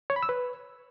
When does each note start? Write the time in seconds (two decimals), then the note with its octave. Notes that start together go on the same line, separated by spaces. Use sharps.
0.10 C#5
0.16 B5
0.23 E6
0.29 B4